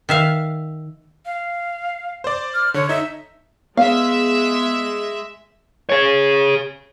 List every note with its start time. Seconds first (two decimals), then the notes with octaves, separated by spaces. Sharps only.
0.09 D#3 E5 F5
1.25 F5
2.24 C5 D5
2.54 F6
2.74 D3 C#5
2.89 D#4 E5
3.77 G#3 B3 E5 F5
5.89 G#4 C#5